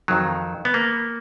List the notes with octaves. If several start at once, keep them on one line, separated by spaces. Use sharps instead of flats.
F2 D#3 F#3
B3
A#3